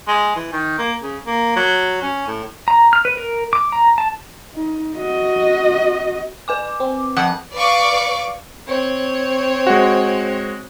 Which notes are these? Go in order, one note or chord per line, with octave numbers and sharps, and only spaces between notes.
G#3
E3
D#3
A#3
C#3
A#3
F#3
C#4
A2
A#5
F6
B4
A#4
D6
A#5
A5
D#4
F#4 D#5
B4 G#5 D6
C4
F2 F#5
B4 D5 F5 C#6 D6
C4 C#5
G#3 F#4